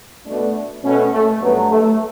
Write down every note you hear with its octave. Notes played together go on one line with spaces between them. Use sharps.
B2 A3 D4
B2 A3 C#4
A3
G2 F#3 A3 B3
A3